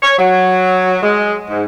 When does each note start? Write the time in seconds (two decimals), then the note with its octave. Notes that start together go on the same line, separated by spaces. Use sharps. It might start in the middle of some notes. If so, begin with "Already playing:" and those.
0.02 C#5
0.18 F#3
1.03 G#3
1.49 G#2